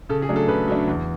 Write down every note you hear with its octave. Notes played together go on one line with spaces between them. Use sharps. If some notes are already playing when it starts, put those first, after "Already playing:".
C#3 A4
G#4
F#3 A3 D4
A4
C#3 B4
F#3 A3 D4
E2